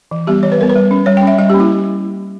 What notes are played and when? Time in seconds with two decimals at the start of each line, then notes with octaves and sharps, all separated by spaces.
0.11 E3
0.27 G3 B3 G4
0.43 E3 C#5
0.52 B4
0.58 G3 B3 A#4
0.69 B4
0.75 G3
0.91 C#4
1.06 G3 C#5
1.17 G5
1.23 C#4 E5
1.38 G3 D#5
1.50 G4
1.54 A#3 C#4
1.60 E4